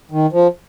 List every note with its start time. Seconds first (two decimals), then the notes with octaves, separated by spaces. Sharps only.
0.11 D#3
0.32 F3